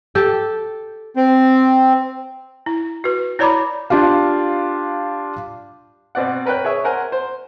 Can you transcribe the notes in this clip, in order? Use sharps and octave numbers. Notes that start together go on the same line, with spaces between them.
G4 A4
C4
E4
F#4 B4
E4 C#5 D5 A#5 B5 D6
D4 F4 G4 F5
B2 C4 D5 F#5
A#4 B4 C#5 G5 F#6
G#4 C#5 E5 C#6
A#4 C5 F#5 G#5
C5